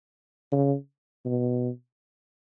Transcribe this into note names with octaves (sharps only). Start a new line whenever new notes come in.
C#3
B2